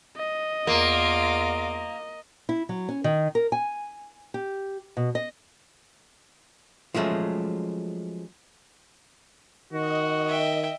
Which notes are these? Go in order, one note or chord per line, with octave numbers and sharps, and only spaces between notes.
D#5
E2 A#3 F4 D6
E4
F#3
C#4
D#3
A#4
G#5
G4
B2
D#5
F3 F#3 G#3 A3 C#4
D#3 F#4 D#5
E5 G5